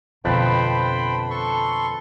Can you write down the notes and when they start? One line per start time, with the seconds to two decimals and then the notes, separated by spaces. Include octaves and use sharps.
0.25 F2 B2 D3 B4 C5 G5 A5 B5
1.31 A4 C6 C#6